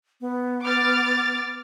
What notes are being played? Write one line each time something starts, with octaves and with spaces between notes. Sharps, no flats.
B3
D6 F6 A6